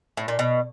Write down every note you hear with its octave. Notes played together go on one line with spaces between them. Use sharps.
A2
A#2
B2